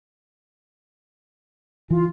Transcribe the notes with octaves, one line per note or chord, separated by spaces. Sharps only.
E3 F4